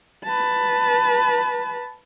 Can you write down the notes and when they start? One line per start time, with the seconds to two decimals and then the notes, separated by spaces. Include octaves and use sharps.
0.24 B4 A5